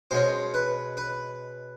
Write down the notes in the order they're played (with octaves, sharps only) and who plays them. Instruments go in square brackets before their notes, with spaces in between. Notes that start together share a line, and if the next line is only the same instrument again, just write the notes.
[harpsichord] B2 G#3 C#4 C5
B4
B4